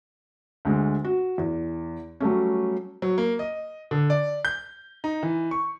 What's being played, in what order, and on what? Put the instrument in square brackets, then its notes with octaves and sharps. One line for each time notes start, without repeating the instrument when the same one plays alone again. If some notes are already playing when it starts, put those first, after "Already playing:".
[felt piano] D2 G#3
F#4
E2
F#3 G3 A3 C#4
[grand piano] F#3
A#3
D#5
D3
D5
G6
D#4
E3
C#6